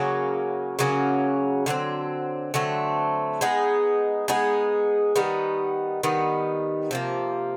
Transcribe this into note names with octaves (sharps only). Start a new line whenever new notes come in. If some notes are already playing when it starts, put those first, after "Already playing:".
Already playing: C#3 F#3 A#3 C#4
C#3 F#3 A#3 C#4
D3 F#3 A3 C4
D3 F#3 A3 C4
G#3 B3 D#4 G#4
G#3 B3 D#4 G#4
D#3 G3 B3 D#4
D#3 G3 B3 D#4
C3 F3 A#3